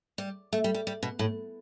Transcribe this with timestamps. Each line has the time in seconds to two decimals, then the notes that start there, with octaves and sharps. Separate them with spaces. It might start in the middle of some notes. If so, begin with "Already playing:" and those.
0.18 G3
0.53 A3
0.64 G3
0.74 G3
0.87 G3
1.03 B2
1.19 A2